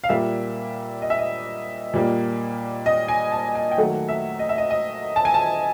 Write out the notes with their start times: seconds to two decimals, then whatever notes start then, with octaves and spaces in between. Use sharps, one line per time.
0.04 F5
0.09 A#2 G3 A#3 E5
1.02 D#5
1.10 E5
1.19 D#5
1.94 A#2 G3 A#3
2.86 D#5
3.08 G#5
3.32 A5
3.55 G#5
3.71 G5
3.78 D#3 F#3 A3 F#5
4.09 E5
4.39 D#5
4.49 E5
4.58 D#5
4.70 D#5
5.16 A5
5.25 G#5
5.34 A5